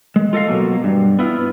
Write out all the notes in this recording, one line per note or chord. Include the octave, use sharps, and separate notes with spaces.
G#3
F4 A4 D#5 F5
B2 F#3 A#3
G2
B3 E4 F4